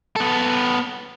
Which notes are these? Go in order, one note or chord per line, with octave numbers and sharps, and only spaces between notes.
B3 A4